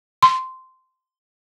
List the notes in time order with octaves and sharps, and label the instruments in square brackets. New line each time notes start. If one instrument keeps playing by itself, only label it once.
[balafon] C6